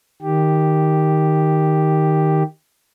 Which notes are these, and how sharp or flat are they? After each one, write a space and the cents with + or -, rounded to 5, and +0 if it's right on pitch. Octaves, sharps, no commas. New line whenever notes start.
D#3 +0 G4 +0